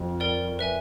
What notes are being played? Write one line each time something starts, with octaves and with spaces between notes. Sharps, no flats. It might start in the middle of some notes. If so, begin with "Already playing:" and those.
Already playing: F2
A#4 D5 G5
B4 E5 G#5